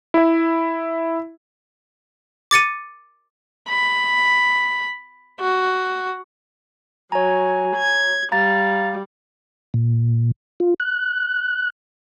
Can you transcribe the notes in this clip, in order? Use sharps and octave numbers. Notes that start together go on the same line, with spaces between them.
E4 E5
D6 A6 C#7 D#7
B5
F#4
F#3 C#5 G#5 A#5
G#6
G3 F5 A#5 A6
A#2
F4
F#6